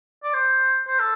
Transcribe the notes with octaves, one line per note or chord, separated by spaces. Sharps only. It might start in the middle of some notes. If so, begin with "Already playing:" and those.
D5
C5
C5
A4